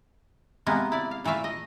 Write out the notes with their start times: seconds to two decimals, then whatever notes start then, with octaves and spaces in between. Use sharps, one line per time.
0.66 C3 G#3 A#3 B3
0.92 E4 D5
1.11 F5
1.24 A#2 E3 A3 E5 F5
1.44 D#5